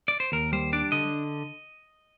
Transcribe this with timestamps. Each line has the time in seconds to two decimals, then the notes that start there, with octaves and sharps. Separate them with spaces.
0.08 D5
0.20 C5
0.32 D#2 A#4
0.53 G3 C5
0.73 D4 D5
0.92 D3 D#5